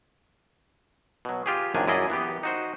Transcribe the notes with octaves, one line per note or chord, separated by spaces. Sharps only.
B2 F#3
F4 G4 G#4
A#1 F#2 D#3 D4 G#5
F#2 E4 G#4 D5 D#5
E3 B3 G4
D#4 F#4 C5